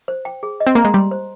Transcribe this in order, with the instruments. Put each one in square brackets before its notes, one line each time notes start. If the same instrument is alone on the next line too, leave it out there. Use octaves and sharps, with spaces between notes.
[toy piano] C5
G5
G#4
D#5
[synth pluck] C4
[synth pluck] A#3 [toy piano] A#5
[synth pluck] G#3
[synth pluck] G3 [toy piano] C6
[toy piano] C5